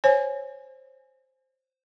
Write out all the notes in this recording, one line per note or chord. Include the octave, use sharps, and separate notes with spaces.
C5 C#5 G#5